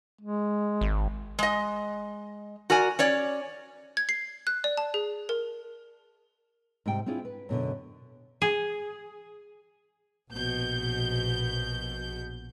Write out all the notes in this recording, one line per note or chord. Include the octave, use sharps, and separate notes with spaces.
G#3
G#1
G#3 D#5
F#4 A#4 D5 G#5
C#4 C#5 D5
G#6
C7
F#6
D5
A5
G#4
A#4
G#2 C3 G3 G5
C4 D4 E4 F4 G#4
B4
F#2 B2 D3
G#4
A#1 B2 G6